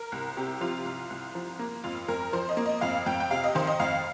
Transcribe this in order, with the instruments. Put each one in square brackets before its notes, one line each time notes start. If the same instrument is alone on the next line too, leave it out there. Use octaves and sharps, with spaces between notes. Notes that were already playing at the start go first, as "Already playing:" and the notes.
Already playing: [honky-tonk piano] A#4
C2
C3 G4
F3 F4
C2
C2
F3
A#3
F2 F4
F2 A#4
F3 C5
D#5
A#3
D#5
F2 F5
F2 G5
G5
C3 F5
D#5
D#3 C5
D#5
F2 F5